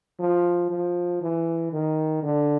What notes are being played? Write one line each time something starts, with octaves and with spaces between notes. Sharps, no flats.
F3
F3
E3
D#3
D3